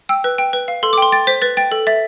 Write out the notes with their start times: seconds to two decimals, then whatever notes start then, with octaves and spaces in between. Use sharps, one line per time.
0.09 G5 E6
0.24 B4
0.38 G5
0.53 B4
0.68 F5
0.83 A4 C6
0.93 D6
0.98 G5 C6
1.12 G5 A6
1.27 C5 B6
1.42 B4 A6
1.57 G5 A6
1.72 A4
1.87 E5 A6